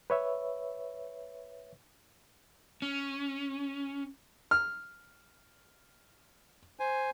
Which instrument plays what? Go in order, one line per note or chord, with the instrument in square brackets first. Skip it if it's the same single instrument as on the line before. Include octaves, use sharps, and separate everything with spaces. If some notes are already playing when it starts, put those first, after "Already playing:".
[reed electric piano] B4 C#5 E5
[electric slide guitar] C#4
[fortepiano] F6
[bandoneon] C5 G#5